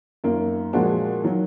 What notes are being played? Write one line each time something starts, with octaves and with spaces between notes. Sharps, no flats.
F#2 D#3 A#3 F4
A#2 F3 G#3 D4 F#4
D#3 F#3